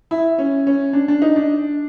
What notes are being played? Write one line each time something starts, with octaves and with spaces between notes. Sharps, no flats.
E4
C#4
C#4
D4
D4
D#4
D4